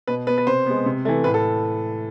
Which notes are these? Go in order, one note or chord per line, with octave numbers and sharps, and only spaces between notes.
B2 B4
B3 B4
B4
C3 C5
G#3 B3
C3
E3 A3
A2 B4
A4